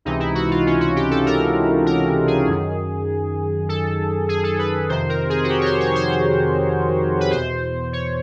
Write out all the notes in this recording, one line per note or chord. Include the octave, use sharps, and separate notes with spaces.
C#2 C3 E3 D#4
E4
F#4
F4
C#4
F#4
G4
A4
A#4
A#4
G#4
F#2 D#3
A4
G#4
A4
B4
F2 C3 D#3 C5
A#4
G#4
F#4
G4
C#5
C5
C#5
C5
B4
E2 B2 C5
C#5